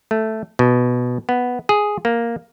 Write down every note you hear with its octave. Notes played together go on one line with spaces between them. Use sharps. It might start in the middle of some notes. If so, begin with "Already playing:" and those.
A3
B2
B3
G#4
A#3